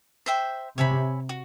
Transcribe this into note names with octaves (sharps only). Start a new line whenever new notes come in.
C5 E5 G5
C3 C#5 E5 G#5 B5
F#4